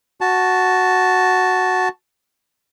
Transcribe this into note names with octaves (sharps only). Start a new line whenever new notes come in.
F#4 A5